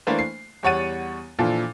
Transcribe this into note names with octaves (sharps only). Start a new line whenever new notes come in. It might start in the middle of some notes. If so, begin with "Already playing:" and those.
E3 A3 A#3 D4 B4 C5
C7
E2 G3 C#5 F#5 A6 D#7
A#2 E3 F3 D4 F4 A4